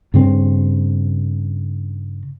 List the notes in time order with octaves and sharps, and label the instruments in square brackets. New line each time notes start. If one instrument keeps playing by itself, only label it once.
[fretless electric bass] G2 C#3 C4